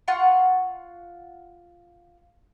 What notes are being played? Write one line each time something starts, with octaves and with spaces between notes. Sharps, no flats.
F4 F#5 C6 C#6